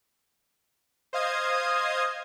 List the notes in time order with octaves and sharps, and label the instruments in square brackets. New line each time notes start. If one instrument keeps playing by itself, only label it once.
[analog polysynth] C5 D#5 F5 D#6 G#6